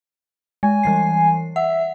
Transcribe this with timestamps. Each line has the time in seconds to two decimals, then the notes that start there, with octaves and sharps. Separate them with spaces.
0.63 G#3 G#5
0.83 E3 G3 C7
1.56 E5 F#5